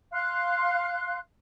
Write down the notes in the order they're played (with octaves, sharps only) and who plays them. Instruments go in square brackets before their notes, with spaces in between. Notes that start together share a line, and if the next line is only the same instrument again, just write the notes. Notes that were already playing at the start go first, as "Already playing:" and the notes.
[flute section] F5 C6 F#6